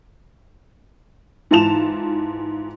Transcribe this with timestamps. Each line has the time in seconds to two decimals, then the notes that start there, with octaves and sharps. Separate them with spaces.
1.51 G#2 E3 F4 A5 E7 F7